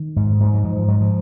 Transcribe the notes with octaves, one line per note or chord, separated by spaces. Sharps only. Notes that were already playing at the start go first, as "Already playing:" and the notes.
Already playing: D#3
G#2
G#3
G#2 G3
F#3
G#2 F3
F3
G#2 F#3
F3